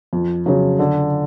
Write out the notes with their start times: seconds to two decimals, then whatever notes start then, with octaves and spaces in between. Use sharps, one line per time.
0.13 F2
0.46 C#3 F#3
0.79 D3